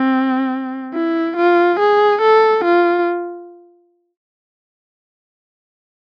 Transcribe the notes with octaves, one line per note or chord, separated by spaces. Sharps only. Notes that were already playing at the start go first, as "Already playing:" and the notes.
Already playing: C4
E4
F4
G#4
A4
F4